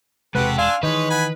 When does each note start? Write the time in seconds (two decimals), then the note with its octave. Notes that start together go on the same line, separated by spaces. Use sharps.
0.35 E1 D#2 C3 G#3 F#4 G4 A4 B4
0.58 D4 F5 G#5 C6 E6
0.83 D#3 E3 G#3 D#4 B4 C#5
1.10 F#5 G#5 B5